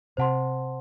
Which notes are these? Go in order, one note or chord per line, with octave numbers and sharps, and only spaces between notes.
C3 C5 F#5 A5 C6